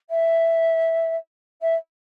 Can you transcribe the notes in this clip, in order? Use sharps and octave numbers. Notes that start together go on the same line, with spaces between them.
E5
E5